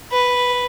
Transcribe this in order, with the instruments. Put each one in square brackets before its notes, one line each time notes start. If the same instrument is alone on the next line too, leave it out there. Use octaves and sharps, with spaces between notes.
[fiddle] B4